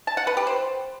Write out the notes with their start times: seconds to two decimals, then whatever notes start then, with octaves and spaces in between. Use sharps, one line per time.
0.07 A5
0.17 F#5
0.27 B4
0.37 G4
0.47 C5